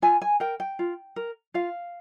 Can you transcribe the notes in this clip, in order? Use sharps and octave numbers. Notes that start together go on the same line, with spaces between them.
F4 G#5
G#5
A#4 G5
G5
F4
A#4
F4 F5